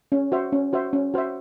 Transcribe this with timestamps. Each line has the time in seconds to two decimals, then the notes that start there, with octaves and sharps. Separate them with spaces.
0.12 C#4
0.32 F#4 C5 E5
0.52 C#4
0.73 F#4 C5 E5
0.93 C#4
1.14 F#4 C5 E5